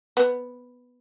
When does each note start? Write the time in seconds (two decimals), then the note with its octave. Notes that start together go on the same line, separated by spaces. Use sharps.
0.17 B3